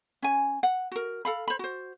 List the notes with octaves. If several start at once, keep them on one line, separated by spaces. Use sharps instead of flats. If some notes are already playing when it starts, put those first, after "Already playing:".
C#4 G#5
F#5
F#4 A#4
A4 F5 B5
C5 B5
F#4 C5